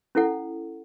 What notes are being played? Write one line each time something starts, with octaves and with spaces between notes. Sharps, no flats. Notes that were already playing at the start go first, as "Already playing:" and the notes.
C#4 E4 A4 F#5